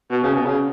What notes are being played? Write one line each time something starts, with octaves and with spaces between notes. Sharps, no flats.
B2
C#3
B2
C#3